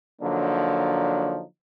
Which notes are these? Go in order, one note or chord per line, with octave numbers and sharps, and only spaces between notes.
D3 F3 F#3 A#3 D4 D#4